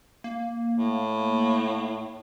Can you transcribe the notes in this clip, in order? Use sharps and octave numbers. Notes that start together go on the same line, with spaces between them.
A#3
A2